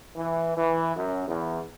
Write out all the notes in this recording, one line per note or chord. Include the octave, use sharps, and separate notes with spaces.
E3
E3
F#2
E2